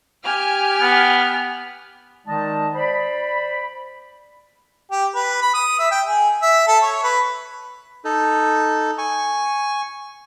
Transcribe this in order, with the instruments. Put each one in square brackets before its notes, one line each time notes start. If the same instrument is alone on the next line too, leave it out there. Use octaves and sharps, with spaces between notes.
[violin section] G4 G#5 F6
[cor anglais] B3
[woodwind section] D#3 G#3 D#4 D5 D#5 A5
C5 D5 B5
[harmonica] G4
B4
B5
D#6
E5
G5
G#4
E5
A4
C#5
B4
[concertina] D#4 A4
G#5 C#6